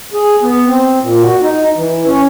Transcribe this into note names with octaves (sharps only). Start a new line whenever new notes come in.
G#4
B3
C4
A#2
F#4
D#4
E3
C#4